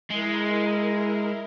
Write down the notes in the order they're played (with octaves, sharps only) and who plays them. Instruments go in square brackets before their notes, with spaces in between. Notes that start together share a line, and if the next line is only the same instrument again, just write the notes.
[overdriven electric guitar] G#3 [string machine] E4 A#4